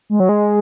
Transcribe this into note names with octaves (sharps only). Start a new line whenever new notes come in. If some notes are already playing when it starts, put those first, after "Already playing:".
G#3
F#3
G#3